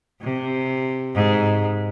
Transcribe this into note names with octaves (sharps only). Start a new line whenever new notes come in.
C3
G#2